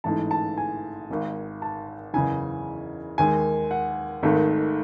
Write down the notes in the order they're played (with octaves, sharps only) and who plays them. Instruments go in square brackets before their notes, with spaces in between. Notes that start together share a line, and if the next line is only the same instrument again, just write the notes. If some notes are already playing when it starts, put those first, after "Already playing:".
[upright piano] A1 G#2 E3 A3 A5
A5
G#5
G#1 G#2 D#3
A5
F#1 E2 C#3 E3 G#5
D#2 D#3 G#3 G#5
F#5
G#1 G#2 D#3 A3